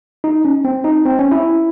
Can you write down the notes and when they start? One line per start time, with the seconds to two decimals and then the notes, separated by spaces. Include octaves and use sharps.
0.24 D#4
0.45 C#4
0.65 C4
0.84 D#4
1.06 C4
1.19 C#4
1.32 E4